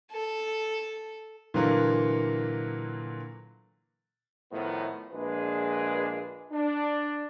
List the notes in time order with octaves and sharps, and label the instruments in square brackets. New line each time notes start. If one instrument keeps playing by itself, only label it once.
[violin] A4
[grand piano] A#2 D3 E3 F#3 A#3
[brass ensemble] A2 D#3 F3 B3
A#1 G#3 D4 G#4 B4
D4